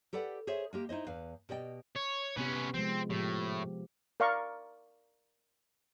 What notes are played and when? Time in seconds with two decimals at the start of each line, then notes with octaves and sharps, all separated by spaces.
0.13 G4 A4 B4 D5 F#5
0.47 G#4 C5 C#5 E5
0.73 G#3 A#3 G4
0.89 D#4 E4 C5 D#5
1.07 E2 B4 F5
1.49 B2 G4 D5 D#5 G5
1.96 C#5
2.37 C3 B3 C#4 G4 B4
2.74 F3 G#3 C4
3.10 A2 F3 G4
4.20 A#4 D5 F5 A#5 C#6